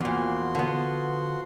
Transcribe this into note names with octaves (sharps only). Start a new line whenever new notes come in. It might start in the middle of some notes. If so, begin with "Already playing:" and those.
E2 A#2 F3 F#4 C6
D3 B3